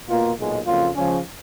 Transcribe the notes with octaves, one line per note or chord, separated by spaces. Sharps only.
B2 A#3 F4
B1 A#2 G#3
F2 C#3 F#3 A#3 F4
C#3 F3 G#3 C#4